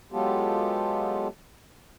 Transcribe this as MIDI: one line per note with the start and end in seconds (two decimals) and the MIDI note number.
0.12 1.28 54
0.12 1.28 56
0.12 1.28 59
0.12 1.28 65
0.12 1.28 67
0.12 1.28 69